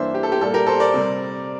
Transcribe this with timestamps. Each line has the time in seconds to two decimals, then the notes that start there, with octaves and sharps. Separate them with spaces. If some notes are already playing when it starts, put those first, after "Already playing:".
Already playing: G2 E3 A#3 D4 C5 E5
0.15 G4
0.23 A4
0.32 G4
0.41 A#2 G3 A#3 A4
0.54 G4 A#4
0.67 A4 C5
0.80 A#4 D5
0.94 C3 G3 C4